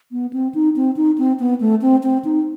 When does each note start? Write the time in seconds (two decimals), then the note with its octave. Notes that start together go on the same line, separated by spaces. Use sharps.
0.12 B3
0.33 C4
0.55 D#4
0.76 C4
0.97 D#4
1.18 C4
1.40 B3
1.61 A3
1.82 C4
2.03 C4
2.25 D#4